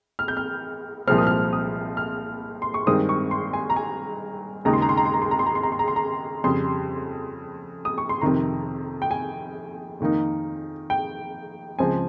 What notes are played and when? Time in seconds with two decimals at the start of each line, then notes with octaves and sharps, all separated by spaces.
0.19 F6
0.28 G6
0.37 F6
1.08 C2 A#2 F3 G#3 C4 F6
1.18 D#6
1.27 F6
1.53 D#6
1.97 F6
2.62 C6
2.74 C#6
2.87 G2 D#3 G#3 C4 D#6
3.09 C#6
3.31 C6
3.53 G#5
3.70 A#5
3.76 G#5
4.65 D#2 C#3 G#3 D#4 A#5
4.73 C6
4.82 A#5
4.89 C6
4.97 A#5
5.05 C6
5.14 A#5
5.22 C6
5.31 A#5
5.39 C6
5.46 A#5
5.55 C6
5.63 A#5
5.72 C6
5.79 A#5
5.88 C6
5.96 A#5
6.44 F2 C#3 G3 C6
7.85 D#6
7.98 C#6
8.09 C6
8.21 F2 C3 D#3 A#5
9.02 G5
9.11 G#5
10.00 F2 D#3 A#3 D#4
10.90 G5
11.79 C#2 C#3 F3 C4 G#5